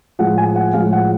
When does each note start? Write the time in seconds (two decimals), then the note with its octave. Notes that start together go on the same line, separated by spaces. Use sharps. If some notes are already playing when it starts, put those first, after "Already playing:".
0.19 A2 F3 G#3 F#5
0.38 G#5
0.56 F#5
0.73 A2 F3 G#3 F5
0.93 F#5